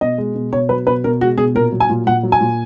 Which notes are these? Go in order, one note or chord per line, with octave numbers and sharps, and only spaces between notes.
B2 D#5
G#3
B2
B2 C#5
F#3 B4
B2 B4
B2 A#4
G#3 F#4
B2 G#4
A#2 A#4
F#3
G#5
A#2
A#2 F#5
F#3
G#5
A#2